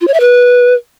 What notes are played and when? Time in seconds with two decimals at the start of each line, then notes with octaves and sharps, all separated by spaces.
0.01 F4
0.08 C#5
0.14 E5
0.20 B4